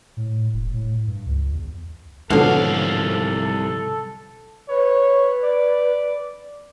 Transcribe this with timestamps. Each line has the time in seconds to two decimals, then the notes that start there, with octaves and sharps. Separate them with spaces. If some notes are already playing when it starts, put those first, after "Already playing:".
0.17 A2
0.53 E1
0.73 A2
1.07 G2
1.27 C#2
1.53 E2
2.30 C2 G#2 B2 D3 F3 F#3 A4 F5
4.69 B4 C#5
5.43 D5